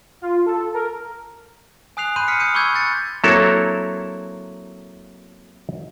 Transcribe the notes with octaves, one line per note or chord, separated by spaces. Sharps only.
F4
A4
A#4
G#5 D#6 F#6 C7 F7
B5 C6 F#6 G6 C7 D#7
D#6 F6 B6 C#7
D#6 G6 C#7 D#7
B5 C#6 D6 E6 G6 G#6
E6 F#6 G6 A6 C#7
F#3 A#3 C4 E4 A4 C#5